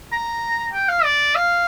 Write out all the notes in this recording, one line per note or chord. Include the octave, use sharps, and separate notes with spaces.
A#5
G5
F5
D5
F5